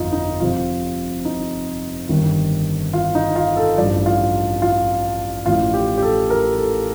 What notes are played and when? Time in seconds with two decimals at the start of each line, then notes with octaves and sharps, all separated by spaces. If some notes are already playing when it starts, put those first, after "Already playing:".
Already playing: G1 F2 D#4 F4
0.13 D#4
0.40 F1 F2 C3 F3 F4
1.25 D#4
2.09 G1 G2 D#3
2.93 F4
3.15 D#4
3.36 F4
3.57 A4
3.77 A1 G2 F3 D5
4.06 F4
4.62 F4
5.46 A1 A2 F3 F4
5.74 G4
5.98 G4
6.03 A4
6.30 A#4
6.58 A4